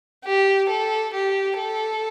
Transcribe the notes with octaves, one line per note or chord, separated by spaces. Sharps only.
G4
A4
G4
A4